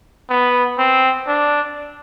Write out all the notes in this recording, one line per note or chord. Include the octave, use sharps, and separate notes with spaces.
B3
C4
D4